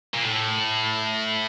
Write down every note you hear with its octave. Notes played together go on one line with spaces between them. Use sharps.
A#2
A2